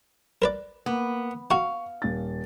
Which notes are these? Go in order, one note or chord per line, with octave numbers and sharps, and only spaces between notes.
A#4 B4 D5
A#3 B3
F#4 F5 F#5 C#6
D#1 A6